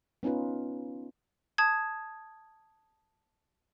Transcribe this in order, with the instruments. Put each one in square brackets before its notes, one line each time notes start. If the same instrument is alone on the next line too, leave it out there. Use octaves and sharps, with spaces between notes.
[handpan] B3 C#4 D#4 F4 B4
[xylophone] A5 D#6 G#6